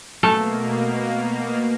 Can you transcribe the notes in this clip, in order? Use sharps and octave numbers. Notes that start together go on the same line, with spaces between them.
B2 A3 A#3